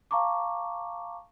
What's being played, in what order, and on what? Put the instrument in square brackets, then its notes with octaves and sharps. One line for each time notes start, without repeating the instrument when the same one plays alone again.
[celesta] F5 A5 A#5 C#6 D6